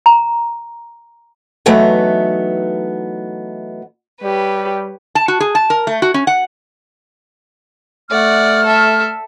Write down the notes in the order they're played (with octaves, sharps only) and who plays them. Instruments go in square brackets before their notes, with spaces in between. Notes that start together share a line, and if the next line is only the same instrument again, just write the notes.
[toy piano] A#5
[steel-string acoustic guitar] E3 F#3 A3 B3 D#4
[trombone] G3 [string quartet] G4 B4 C#5
[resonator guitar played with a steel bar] A5
F#4
G#4
A5
A#4
A3
F#4
C#4
F#5
[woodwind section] A3 F6 [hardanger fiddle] D5 F#5
[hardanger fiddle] A4 E5